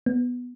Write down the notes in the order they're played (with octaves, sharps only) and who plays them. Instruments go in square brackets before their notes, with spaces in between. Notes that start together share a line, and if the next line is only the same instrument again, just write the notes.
[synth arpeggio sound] B3